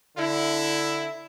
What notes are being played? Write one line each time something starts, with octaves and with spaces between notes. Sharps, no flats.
D3 E4